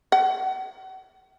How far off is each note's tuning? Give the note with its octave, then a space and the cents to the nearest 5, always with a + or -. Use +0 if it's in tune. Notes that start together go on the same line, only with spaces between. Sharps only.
F#5 +40